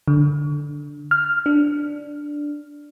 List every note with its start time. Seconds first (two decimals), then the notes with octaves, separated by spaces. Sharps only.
0.08 D3
1.11 F6
1.46 D4